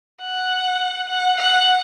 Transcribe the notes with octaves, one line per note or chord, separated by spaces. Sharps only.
F#5
F#5
F#5